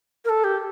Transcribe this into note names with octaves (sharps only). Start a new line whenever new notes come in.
A#4
A4
G4